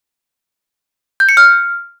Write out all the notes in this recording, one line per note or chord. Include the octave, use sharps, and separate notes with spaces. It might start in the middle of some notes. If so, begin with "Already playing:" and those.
G6
C#7
F6